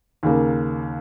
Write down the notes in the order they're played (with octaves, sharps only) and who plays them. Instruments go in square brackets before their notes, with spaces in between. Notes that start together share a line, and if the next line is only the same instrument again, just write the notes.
[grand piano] D#2 C#3 A#3